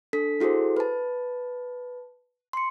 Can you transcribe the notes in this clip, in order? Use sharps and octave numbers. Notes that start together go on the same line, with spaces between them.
D4 A4 B6
E4 F#4 G#4 A4 C5
B4 A5
C6 C#7